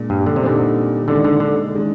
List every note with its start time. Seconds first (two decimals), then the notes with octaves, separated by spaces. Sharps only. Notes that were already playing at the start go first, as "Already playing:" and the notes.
Already playing: A#2 G#3 D4
0.10 G2
0.26 D3
0.36 C3
0.43 A#2 D3 G3 C4 D#4
1.08 D3 D#3 G#3 D4
1.24 D3
1.40 D3
1.73 D#3 G#3 D4